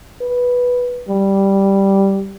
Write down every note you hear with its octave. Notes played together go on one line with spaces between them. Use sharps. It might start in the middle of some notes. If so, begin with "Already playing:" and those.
B4
G3